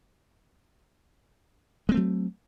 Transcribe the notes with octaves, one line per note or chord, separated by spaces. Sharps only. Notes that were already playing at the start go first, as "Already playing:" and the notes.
F#3 G#3 A3 C4